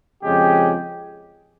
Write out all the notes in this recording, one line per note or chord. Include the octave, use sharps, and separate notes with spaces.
F2 C#3 F3 G#3 G4